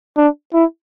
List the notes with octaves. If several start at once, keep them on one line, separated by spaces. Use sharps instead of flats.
D4
E4